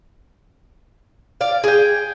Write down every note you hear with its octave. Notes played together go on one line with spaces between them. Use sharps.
D5 F5
G#4 G5